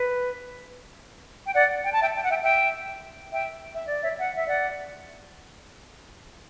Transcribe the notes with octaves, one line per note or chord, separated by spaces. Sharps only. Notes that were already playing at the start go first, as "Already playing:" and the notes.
Already playing: B4
G5
D5 F#5
G5
A5
E5 G5
G5
F#5
E5 G5
E5 G5
E5 G5
E5
D5
C#5 E5
F#5
E5
D5 F#5